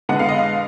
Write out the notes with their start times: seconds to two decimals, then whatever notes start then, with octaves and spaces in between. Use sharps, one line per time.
0.09 D3 G#3 B3 F#5
0.19 F5
0.29 D#5
0.39 F5